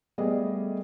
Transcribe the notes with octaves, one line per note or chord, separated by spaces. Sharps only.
G3 A3 B3 G#4 D5 D#5